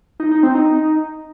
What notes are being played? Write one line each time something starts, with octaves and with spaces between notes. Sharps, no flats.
D#4
D#4
C4
D#4